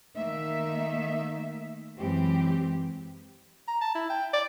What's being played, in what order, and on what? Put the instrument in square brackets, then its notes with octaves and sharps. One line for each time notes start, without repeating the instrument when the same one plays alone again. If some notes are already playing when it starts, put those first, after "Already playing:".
[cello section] D#3 A3 A#3 D#4 E5
F#2 E3 G#3 C4 G4
[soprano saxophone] A#5
A5
E4
G5
D5